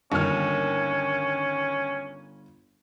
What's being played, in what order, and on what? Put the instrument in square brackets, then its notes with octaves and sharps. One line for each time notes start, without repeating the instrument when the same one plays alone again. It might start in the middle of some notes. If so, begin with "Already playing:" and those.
[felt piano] G1 F6 [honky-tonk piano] D#2 [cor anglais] C#4